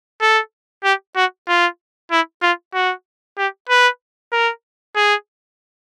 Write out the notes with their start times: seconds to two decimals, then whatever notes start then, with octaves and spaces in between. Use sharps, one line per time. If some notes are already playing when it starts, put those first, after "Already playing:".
0.21 A4
0.84 G4
1.16 F#4
1.48 F4
2.11 E4
2.42 F4
2.74 F#4
3.38 G4
3.69 B4
4.32 A#4
4.96 G#4